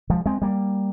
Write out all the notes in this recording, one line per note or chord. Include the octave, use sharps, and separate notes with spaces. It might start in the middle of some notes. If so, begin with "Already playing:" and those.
F3 G#3
G#3 C4
G3 A#3